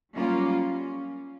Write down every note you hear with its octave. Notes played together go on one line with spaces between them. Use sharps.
F#3 G3 A#3 C#4 F4
C#4